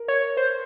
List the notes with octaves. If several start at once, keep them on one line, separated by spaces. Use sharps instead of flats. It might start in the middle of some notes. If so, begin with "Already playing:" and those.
Already playing: A#4
C#5
C5